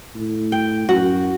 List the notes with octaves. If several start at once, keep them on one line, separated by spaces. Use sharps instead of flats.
A2
G5
F#2 F#4